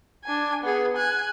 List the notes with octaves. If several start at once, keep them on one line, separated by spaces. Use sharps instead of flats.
D4 G#5
B3 G#4
G#5 F#6